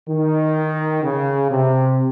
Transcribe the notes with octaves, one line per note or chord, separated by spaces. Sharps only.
D#3
C#3
C3